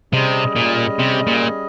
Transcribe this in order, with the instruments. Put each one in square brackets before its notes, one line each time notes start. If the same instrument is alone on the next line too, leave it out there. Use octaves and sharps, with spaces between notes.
[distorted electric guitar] C3 [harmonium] G3 C#4 G#4 D#5
[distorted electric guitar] A#2
C3
A#2